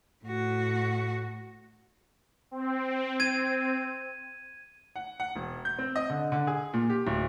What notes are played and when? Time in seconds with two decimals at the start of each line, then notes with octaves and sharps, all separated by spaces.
0.25 A2 F#4
2.51 C4
3.20 G#6 D#7
4.96 F#5
5.20 F#5
5.36 E1
5.65 G6
5.78 C4
5.96 D#5
6.10 D3
6.32 D3
6.47 G#4
6.73 A#2
6.90 G4
7.07 D1